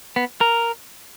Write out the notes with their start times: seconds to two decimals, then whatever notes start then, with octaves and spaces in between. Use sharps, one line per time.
0.16 B3
0.41 A#4